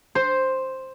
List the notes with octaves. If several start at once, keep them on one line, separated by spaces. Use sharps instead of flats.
C5